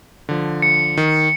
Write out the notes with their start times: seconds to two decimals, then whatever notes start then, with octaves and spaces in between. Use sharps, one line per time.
0.29 D3 F3
0.62 C#7
0.97 D#3